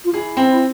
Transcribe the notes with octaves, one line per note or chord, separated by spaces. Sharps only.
F4
E4 G#4
C4